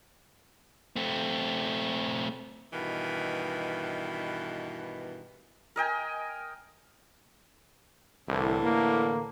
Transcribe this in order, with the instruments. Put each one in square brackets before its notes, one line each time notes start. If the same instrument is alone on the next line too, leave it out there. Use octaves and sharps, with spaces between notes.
[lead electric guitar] A3 C4
[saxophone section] G2 B2 D#3 E3
[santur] A#4 D#5 G5 G#5
[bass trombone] C2 [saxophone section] A2 D3 E3
[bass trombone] A#3